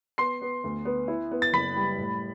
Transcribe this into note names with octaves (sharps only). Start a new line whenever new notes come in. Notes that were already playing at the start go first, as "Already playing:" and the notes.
B3 C6 C7
B3
D2
B3
E4
B3
A6
F#1 B5 B6
G3
A2